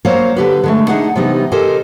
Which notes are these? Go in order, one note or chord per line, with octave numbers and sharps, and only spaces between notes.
F#3 A#3 C5 C#5 F5 A#5
D3 G4 B4
D3 G#3 A3
D4 D#4 G#4 F#5
C3 E3 G3 B3 D#4
G4 A4 A#4 C5 D#5 G#5